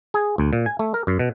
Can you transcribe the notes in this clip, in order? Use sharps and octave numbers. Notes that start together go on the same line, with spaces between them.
G#4
D2
A#2
G#5
A3
A#4
F#2
B2